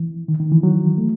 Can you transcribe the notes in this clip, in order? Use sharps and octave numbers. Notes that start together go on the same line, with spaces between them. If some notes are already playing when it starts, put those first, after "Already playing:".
Already playing: E3
D#3
D#3
E3
F#3
A3